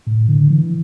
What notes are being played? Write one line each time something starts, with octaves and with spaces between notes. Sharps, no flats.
A2
D3
E3